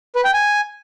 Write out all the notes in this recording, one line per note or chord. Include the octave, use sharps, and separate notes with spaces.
B4
G5
G#5